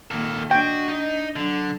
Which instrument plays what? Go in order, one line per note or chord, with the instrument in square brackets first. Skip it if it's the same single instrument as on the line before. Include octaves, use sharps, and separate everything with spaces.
[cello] A#2 D#3 [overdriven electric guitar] A#3 A4
[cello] D4 D#5 [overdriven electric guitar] F#4 [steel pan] G5
[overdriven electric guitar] D#4
[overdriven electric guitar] D3 [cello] F#3 D4